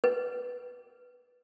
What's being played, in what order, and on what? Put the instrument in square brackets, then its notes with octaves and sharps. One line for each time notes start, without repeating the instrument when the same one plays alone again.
[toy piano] B4